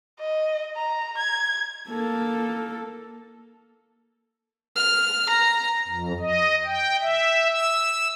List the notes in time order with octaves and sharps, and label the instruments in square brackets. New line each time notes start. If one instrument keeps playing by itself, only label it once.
[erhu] D#5
A#5
G#6
[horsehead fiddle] A#3 A4
[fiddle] F6
A#5
[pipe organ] F2
D#5
G5
E5
E6